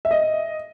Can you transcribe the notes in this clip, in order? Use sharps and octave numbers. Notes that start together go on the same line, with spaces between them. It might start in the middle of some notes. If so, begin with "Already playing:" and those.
E5
D#5